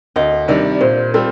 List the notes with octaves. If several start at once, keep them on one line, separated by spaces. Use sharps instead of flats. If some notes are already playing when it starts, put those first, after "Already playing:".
D2 D#5
C3 D#3 G3 D4 D5
A#2 C5
G3 C4 F4 A4